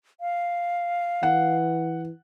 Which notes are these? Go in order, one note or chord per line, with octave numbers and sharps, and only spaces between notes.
F5
E3 F#5